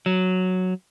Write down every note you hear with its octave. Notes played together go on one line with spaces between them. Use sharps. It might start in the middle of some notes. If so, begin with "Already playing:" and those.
F#3